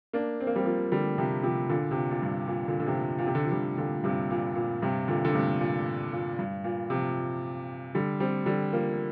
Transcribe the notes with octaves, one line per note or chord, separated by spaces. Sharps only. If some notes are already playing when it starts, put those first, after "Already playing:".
A#3 D4
C4
A#3
G3 C4
F3 A#3
D3 G3
C3 F3
C3 F3
A#2 D3
C3
A#2
A#2
G2
A#2
A#2 D3
D3
C3 F3
A#2
C3
D3
F3
D3 G3
A#2 D3
G2 C3
A#2
A#2
G2 C3
A#2 D3
D3
G2 C3
A#2
A#2
G2
A#2
C3 F3
D3 G3
G3 C4
D3 G3
F3 A#3